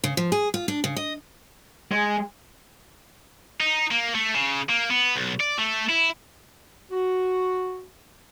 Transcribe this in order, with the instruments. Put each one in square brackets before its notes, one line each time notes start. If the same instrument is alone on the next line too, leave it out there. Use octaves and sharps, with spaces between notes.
[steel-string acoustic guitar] C#3
F3
G#4
F4
D4
C#3
D#5
[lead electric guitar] G#3
[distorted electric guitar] D#4
A#3
A3
C#3
A#3
B3
B1
D5
A3
E4
[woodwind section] F#4